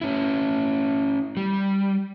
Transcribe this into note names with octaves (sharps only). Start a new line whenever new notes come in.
C#4 E4
G3